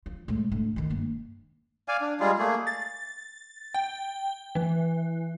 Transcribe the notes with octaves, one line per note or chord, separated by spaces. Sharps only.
F3
A2 G#3
A2 D3
D#3 E3
G2 A#3
D5 F5 G#5
D4
G3 G#3 F4 G#4
A3 A#3 G#4
A6
G5
E3